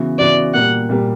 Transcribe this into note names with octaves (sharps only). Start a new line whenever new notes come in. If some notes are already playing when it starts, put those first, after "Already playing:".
Already playing: C#3 E3 B3 F#4
C#3 E3 B3 F#4 D5
A#2 G3 A#3 F#5
A#2 G3 A#3